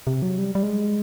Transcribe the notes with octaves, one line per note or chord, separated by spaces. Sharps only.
C3
F#3
G3
G3
G#3